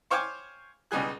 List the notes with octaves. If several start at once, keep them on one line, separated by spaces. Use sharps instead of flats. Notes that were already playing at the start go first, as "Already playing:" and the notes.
C5 C#5 F5 G5 G#5 D6
C#2 B2 G3 G#4 F#6